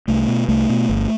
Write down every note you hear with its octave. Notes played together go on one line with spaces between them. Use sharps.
C2 A3
B2
C2 A3
B2
G1